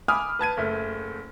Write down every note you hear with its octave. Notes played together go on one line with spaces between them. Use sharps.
G#5 B5 D6 D#6 F6
B4 A5 G#6 D#7
F#1 A3